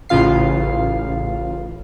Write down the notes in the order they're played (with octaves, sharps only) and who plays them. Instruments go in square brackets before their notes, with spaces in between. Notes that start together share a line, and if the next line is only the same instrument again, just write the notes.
[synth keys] A1 C#3 F4 F5 C7